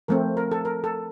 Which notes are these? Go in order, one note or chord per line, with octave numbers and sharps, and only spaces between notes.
F3 A3 C4 A#4
A#4
A4
A#4
A4